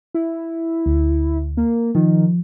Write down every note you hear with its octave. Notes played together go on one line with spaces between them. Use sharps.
E4
D2
A#3
D#3 F3